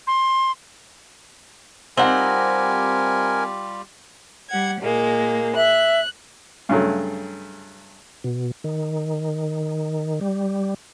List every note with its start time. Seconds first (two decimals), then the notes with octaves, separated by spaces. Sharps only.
0.07 C6
1.97 G3 C4 D#4 F4 G4 A#4 F#5 G#5
4.49 G3 F#5 G#6
4.82 A#2 G#3 A#3
5.56 E5 F#6
6.69 G2 C#3 F#3 A3
8.24 B2
8.64 D#3
10.21 G3